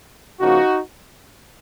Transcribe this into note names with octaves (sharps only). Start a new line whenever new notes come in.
C#3 F3 A#3 D#4 F#4